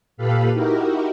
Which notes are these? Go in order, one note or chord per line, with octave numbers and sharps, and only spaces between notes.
A#2 G4 A4 B4 F5 B5
D#4 E4 F#4 G4 A#4